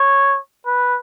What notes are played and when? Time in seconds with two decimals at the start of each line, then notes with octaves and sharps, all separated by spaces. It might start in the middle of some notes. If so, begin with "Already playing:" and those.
Already playing: C#5
0.66 B4